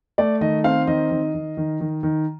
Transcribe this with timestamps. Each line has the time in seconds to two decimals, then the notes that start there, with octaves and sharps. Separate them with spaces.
0.18 A3 D5
0.41 D#3 D#5
0.64 C4 F5
0.87 D#3 D#5
1.11 D#3
1.34 D#3
1.57 D#3
1.80 D#3
2.03 D#3